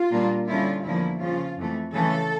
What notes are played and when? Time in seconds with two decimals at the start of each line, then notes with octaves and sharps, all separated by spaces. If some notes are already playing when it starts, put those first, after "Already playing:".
Already playing: F4
0.11 A#2 G3 A#3 D4
0.47 D3 G3 C#4 E4 F4
0.84 E2 D3 F3 A#3 C#4 E4
1.21 C#3 F3 C#4 F4
1.57 F2 E3 A3
1.94 C#3 E3 A3 C#4 A4